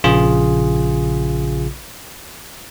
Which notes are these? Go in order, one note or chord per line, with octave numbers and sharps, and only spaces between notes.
A#1 C#3 F4 G#4